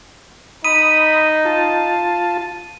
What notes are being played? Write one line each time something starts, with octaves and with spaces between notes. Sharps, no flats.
D#4 B5 D#6 D#7
F4 A5